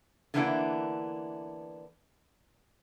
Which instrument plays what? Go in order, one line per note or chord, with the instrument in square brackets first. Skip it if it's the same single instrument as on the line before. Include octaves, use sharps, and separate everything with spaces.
[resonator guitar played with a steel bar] D3 E3 A#3 B3 D4 E4